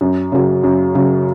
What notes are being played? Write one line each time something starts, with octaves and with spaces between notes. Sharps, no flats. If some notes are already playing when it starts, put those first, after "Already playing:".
F#2
C#3 F#3
F#2
C#3 F#3